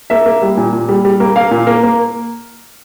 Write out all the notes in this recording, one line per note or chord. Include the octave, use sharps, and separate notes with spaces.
A#3 E5
A#3
G3
A#2
A#2
G3
G3
A#3
A#3 F5
A#2
A#3
A#3